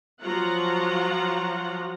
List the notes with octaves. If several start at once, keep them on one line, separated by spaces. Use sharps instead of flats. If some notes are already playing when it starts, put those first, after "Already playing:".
F3 F#3 F4 F#5 A#5